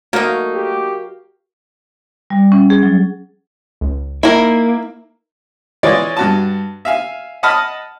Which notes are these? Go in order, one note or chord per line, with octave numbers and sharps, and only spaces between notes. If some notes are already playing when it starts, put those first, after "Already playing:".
A3 A#3 D#4 F#4 A#4 F5
G4
G3
C#4
G#4
F#3
C#2
A#3 D#4 E4 A#4
E3 G#3 F4 C#5 D5
G2 F#4 A5
E5 F5 G#5
D#5 F#5 A5 B5 D#6 F6